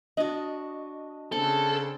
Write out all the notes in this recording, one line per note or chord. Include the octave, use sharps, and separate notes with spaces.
D4 F#4 D#5
C#3 C4 D4 A4